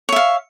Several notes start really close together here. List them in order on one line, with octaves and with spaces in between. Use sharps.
C#5 E5 F5